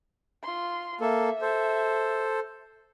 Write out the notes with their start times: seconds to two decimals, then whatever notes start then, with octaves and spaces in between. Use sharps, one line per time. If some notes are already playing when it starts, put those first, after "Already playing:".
0.43 F4 C6
1.01 A#3 A4 E5
1.42 A4 C5